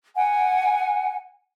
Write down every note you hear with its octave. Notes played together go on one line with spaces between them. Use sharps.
F#5 G#5